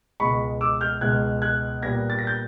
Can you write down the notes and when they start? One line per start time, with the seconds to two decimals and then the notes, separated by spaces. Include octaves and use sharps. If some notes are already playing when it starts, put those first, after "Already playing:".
0.20 C#2 B2 G#3 B5 C#6
0.61 D6 E6
0.81 F6 G6
1.01 C#2 B2 G#3 F#6 G#6
1.42 F#6 G#6
1.82 A#2 G3 B3 G#6 A#6
2.10 A6
2.19 A#6
2.27 G6 A6